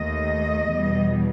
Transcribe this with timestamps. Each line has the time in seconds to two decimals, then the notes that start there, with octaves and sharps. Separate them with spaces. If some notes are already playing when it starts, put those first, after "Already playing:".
Already playing: D#2 D#3 A3 D#5
0.67 E2 B2 G3